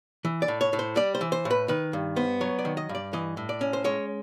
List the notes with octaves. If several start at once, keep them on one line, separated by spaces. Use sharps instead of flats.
E3
D5
A2
C#5
A2
C5
G3 D5
C5
E3
C5
A2
B4
D#3 B4
G2
B3 C5
F#3 C#5
D5
D#3
D#5
G2
D5
E3 D#5
A2
D5
C#4
C5
G#3 C#5